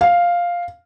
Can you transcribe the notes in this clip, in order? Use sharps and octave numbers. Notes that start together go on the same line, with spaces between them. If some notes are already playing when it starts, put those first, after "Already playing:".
F5